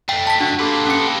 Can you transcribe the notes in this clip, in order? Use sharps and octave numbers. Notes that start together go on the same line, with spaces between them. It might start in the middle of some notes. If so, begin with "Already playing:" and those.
F2 A3 G5
A5 B6
D4 F#4
A#3 G4 A4 B4 C6
C#4 C#7